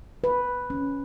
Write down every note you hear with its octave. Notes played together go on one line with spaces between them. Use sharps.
B4
C#4